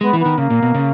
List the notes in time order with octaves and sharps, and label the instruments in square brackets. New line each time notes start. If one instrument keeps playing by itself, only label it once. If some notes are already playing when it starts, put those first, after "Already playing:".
[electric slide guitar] G#3 [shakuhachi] B3
[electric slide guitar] E3
[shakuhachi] B3
[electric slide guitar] D#3
[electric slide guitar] C#3 [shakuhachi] A#3
[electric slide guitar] A#2
B2
C#3